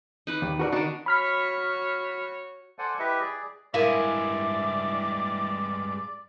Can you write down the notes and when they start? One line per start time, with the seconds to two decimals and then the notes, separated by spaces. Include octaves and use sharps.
0.27 D#4 B4 D6
0.42 D#2
0.59 F#4 A#4 D5
0.72 D#3 D4 D#4 F#4
1.06 F#4 C#5 B5 F6 B6
2.79 A4 C5 D5 F#5 G#5
2.99 E4 G4 B4 D#5 E5
3.21 G#4 D5
3.74 G2 G#3 E4 A#4 D5 E5 F5 G#5